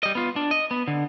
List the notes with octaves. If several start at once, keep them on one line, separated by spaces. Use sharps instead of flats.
G3 D#5
B3 F4
D4
D#5
B3
D3